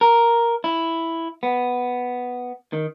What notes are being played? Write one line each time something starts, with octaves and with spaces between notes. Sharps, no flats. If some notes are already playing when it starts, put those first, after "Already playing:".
A#4
E4
B3
D#3